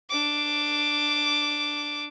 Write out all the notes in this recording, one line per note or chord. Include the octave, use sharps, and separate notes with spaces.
D4 D6